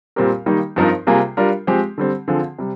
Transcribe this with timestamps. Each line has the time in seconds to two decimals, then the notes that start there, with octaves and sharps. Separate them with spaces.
0.16 A#2 G3 C4 G4 A#4
0.46 D#3 G3 A#3 D#4
0.76 G2 F3 C4 D#4 A#4
1.07 C3 G3 A#3 F4 G#4
1.37 G3 D4 F4 A#4
1.67 F3 G#3 C4 G4
1.98 D3 G3 C4
2.28 D3 F3 C4 F4 G#4
2.59 C3 G3